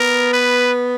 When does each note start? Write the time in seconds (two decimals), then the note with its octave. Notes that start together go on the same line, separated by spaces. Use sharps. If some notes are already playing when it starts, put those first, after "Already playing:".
Already playing: B3 A#4
0.33 B4